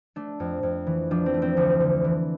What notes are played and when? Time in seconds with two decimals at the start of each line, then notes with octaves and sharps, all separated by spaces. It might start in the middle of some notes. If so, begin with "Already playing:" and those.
0.16 A3 D4
0.40 F2
0.63 F2
0.87 E3
1.11 F3 D4
1.26 C4
1.34 A3
1.42 C4
1.57 D2 D4
1.80 D3
2.04 E3